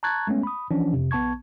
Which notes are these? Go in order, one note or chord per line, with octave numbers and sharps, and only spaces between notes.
A5 A#5 C#6 F#6 G#6 A6
G#3 A3 B3 C#4
B5 D#6
E3 F3 C#4 D4
F2 C3
A#1 B3 A5 C#6 G#6